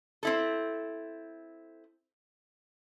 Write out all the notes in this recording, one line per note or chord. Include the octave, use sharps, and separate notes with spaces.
C4 E4 A4